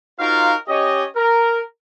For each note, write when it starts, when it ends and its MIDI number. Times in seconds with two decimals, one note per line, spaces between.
0.20 0.54 63
0.20 0.54 65
0.20 0.54 66
0.20 0.54 70
0.20 0.54 72
0.20 0.54 77
0.68 1.04 61
0.68 1.04 67
0.68 1.04 73
0.68 1.04 75
1.16 1.61 70